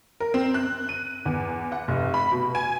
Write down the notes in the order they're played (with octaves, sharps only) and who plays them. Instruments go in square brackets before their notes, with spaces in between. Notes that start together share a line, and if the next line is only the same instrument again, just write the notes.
[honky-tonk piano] A#4
C4
F#6
D#7
E2
F#5
F1
B5
B2
G#5